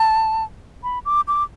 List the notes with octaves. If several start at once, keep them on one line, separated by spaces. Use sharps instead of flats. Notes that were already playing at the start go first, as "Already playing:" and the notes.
Already playing: A5
B5
D6
D6